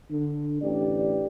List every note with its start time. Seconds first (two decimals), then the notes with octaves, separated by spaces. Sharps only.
0.11 D3
0.62 A1 D4 G4 D5